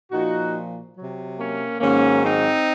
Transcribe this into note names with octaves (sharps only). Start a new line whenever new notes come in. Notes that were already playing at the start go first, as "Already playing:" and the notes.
A#2 F3 D#4 F#4
C3 F#3
A#3 C#4
G#2 D#3 F#3 A#3 C#4
C4 D#4